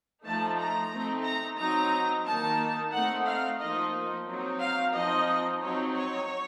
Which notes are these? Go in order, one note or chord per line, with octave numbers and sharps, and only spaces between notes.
F3 A3 D#4 A5
A#5
A3 C4 D#4
A#5
F#3 C4 D#4 A#5
D#3 A#3 D#4 A5
A3 C4 D#4 F#5
F5
F3 A#3 D#4 D#5
F#3 C4 D#4
F5
F3 C4 D#4 D#5
F#3 C4 D#4 C#5
C#5